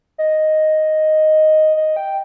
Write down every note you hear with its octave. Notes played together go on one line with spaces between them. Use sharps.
D#5
D#5
G5